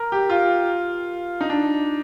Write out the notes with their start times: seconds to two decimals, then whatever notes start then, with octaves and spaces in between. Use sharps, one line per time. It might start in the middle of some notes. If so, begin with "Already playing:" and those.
Already playing: A#4
0.12 G4
0.29 F4
1.41 D#4
1.50 D4